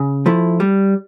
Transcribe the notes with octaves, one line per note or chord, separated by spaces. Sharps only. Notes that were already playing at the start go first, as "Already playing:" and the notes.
Already playing: C#3
F3 A3 E4
G3